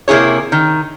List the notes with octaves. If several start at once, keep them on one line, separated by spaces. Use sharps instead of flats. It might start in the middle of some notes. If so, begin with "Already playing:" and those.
C3 A#3 E4 G#4 C#5
D#3